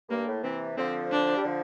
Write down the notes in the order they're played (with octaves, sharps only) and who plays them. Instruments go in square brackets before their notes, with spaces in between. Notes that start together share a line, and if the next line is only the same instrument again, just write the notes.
[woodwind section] G2 [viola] A#3
[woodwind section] A2
[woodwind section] C3 E3 [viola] C4
[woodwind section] D3 F3 [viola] C4
[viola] D4
[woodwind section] G3
D3 F3